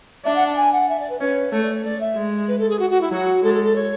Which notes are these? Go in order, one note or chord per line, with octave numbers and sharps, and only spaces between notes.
D4 E5
F#5
A5
G#5
F#5
E5
D5
B4
C#4 B4
A3 C#5
D5
C#5
A3 D5
E5
G#3
B4
A4
G#4
F#4
F#4
E4
F#3 F#4
G#3 A4
A4
A4
C#5